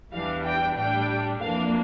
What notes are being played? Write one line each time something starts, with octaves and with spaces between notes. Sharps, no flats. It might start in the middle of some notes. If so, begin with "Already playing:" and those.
E2 E3 G3 D4 F5
G5
A2 G3 D4 G5
F2 E3 A#3 D4 F5